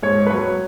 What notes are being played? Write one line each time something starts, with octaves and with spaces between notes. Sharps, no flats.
G#2 C#5
B4
F#3 C#5